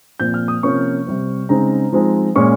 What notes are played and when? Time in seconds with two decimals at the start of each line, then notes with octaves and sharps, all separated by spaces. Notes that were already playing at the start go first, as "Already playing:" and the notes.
0.20 A#2 F3 C4 G6
0.34 F6
0.48 D#6
0.63 C3 F3 A#3 C#4 C#6
1.06 C3 G3 C4
1.49 C#3 G#3 C4 D#4 A#5
1.92 F3 G#3 C4 D#4
2.35 A#2 G#3 C#4 C#6